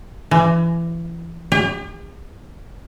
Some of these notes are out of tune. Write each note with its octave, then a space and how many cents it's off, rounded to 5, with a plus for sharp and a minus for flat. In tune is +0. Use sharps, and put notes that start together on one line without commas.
E3 +30
G4 +45